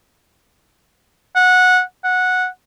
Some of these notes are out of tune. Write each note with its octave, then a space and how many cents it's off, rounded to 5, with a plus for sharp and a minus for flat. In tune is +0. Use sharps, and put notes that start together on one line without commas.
F#5 -15
F#5 -10